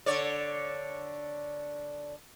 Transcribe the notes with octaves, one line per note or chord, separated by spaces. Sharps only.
D3 C#5 D5